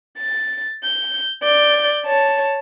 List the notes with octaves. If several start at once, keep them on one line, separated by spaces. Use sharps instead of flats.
A6
G6
D5 G6
C#5 A5